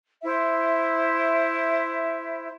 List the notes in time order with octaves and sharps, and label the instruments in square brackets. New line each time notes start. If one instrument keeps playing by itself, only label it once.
[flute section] E4 C5 E5